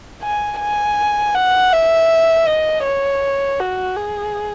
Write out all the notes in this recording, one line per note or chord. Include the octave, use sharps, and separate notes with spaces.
G#5
G#5
F#5
E5
D#5
C#5
F#4
G#4